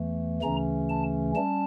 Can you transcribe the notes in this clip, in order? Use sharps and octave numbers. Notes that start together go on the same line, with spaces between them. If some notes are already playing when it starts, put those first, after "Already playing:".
Already playing: E2 E3 A3
D2 C#3 E3 A3 C#4 A#5
A5
G3 C#4 A5